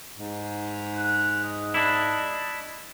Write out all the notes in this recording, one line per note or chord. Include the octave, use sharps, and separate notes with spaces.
G#2
F#6
D#5
D4 E4